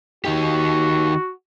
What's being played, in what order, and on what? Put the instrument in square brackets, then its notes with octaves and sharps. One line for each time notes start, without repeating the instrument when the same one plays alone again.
[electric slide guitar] D#3 D#4 G4 [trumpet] F#4